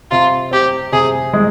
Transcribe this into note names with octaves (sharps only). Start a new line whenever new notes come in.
C3 F4
C4 G4
C3 G#4
G#3